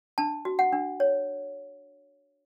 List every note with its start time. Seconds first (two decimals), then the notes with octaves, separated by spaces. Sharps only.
0.18 D4 A5
0.45 F#4
0.59 F#5
0.73 D4
1.00 C#5